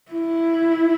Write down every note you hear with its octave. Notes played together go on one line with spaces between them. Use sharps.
E4